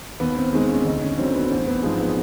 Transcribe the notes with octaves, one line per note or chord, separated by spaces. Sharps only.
D#2 B3
C4
D#3 G#3 C4
C#4
D2 D#4
C#4
D3 F#3 C4
B3
A1 C4
B3
G#2 F3 G#3 B3
B3